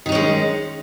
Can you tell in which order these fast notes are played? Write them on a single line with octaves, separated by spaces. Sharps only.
D#3 D#4 C#4 G#3